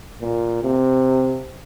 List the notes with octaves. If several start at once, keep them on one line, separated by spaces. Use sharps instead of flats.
A#2
C3